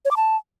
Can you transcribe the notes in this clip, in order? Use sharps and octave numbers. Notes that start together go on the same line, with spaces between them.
C#5
D6
A5